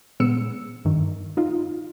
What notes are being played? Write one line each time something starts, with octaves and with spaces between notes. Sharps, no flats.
A#2 G#3 B3 E6 C#7
G2 D#3
D#4 F4